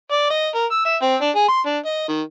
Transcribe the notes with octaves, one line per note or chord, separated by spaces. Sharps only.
D5
D#5
A#4
E6
E5
C4
D4
G#4
C6
D4
D#5
D#3